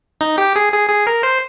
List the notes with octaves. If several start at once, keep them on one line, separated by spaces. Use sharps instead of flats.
D#4
G4
G#4
G#4
G#4
A#4
C5